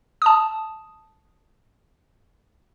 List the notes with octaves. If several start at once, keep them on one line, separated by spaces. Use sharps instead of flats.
A5 D#6